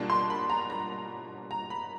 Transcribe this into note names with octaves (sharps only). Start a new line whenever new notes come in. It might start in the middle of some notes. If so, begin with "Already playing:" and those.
Already playing: B2 G3 A#3 D4 F4 A5
C6
B5
A#5
A#5
A#5
B5